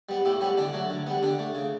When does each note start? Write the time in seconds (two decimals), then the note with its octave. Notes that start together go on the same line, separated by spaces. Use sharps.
0.09 G3 B3
0.25 A2 E4 G4
0.41 G3 B3 C#4 E4
0.58 D3 D4
0.74 F#3 A3
0.90 D3
1.07 G3 B3
1.22 D3 D4
1.39 A3
1.55 C#3